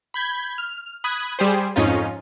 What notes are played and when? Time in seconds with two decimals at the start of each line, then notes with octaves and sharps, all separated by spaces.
0.14 B5 G6 G#6
0.58 F6
1.04 B5 D#6 F#6 G#6
1.39 G3 G4 G#4 C5
1.76 F2 G#2 C#4 D#4 F4